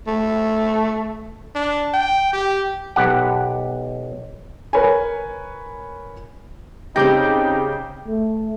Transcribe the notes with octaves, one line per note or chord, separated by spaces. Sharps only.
A3
D4
G5
G4
B1 G4 F#5
A#4 B4 C#5 G#5
C#3 C4 D#4 G4 G5 D6 G6 A#6
A3